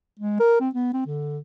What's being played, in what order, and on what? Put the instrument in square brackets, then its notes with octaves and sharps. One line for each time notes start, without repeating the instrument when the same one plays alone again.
[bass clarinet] G#3
A#4
C4
B3
C4
D3